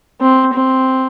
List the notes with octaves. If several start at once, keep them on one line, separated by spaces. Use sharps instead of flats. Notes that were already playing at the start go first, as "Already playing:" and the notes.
C4
C4